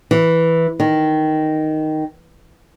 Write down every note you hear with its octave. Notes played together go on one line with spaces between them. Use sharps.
E3
D#3